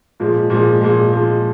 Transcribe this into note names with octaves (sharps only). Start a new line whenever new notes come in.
A#2 F3 G#3
A#2 F3 G#3
A#2 F3 G#3
A#2 F3 G#3